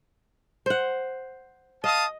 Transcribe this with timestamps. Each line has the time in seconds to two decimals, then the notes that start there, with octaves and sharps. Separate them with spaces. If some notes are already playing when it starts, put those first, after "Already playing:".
0.66 C5 F#5
1.84 D#5 F5 A5 D#6